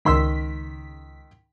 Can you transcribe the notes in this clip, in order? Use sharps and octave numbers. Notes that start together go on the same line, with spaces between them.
C#2 D#3 C6 E6 B6